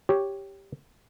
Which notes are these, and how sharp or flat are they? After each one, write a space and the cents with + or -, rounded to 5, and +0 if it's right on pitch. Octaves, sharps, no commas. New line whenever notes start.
G4 +0 C#5 +0